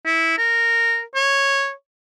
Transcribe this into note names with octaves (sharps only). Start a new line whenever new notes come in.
E4
A#4
C#5